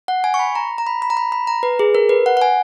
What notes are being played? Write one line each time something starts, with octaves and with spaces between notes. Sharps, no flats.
F#5
G#5
C#6
B5
A#5
A#5
B5
B5
A#5
B5
B5
A#5
B4
G#4
A#4
B4
F#5
F#5
G#5